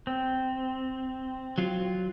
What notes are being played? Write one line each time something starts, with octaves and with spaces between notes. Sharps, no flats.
C4
F#3 F4